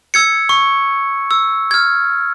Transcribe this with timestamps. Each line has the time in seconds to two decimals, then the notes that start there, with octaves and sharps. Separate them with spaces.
0.14 E6 G#6 C#7
0.49 C#6
1.31 E6
1.71 F6 G#6